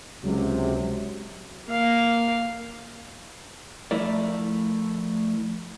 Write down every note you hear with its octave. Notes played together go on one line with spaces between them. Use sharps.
C#2 C3 F#3
A#3 F5
F3 A3 E4 A#4 D5